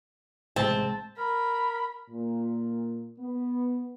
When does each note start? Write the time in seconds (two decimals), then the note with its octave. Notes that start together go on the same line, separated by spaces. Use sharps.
0.56 A1 C3 G#3 A3 C4 A5
1.18 A#4 B5
2.10 A#2
3.18 B3